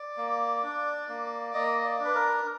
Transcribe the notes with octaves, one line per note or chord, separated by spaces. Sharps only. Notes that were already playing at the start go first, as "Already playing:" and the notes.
Already playing: D5
A#3
D4
A#3
A#3 D#5
D5
D4
B4
A#4